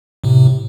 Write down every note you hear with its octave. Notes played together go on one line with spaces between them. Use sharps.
A2 C3